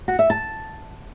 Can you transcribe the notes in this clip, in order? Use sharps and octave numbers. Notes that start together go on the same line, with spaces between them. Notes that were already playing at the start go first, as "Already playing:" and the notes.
F#4
E5
A5